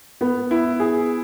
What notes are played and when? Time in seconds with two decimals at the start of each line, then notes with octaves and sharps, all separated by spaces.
0.21 B3
0.51 E4
0.80 G#4